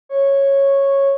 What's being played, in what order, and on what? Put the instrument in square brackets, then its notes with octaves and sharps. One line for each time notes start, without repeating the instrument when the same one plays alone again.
[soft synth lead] C#5